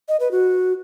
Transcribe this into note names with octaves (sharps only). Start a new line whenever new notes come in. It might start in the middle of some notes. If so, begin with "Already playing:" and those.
D#5
B4
F#4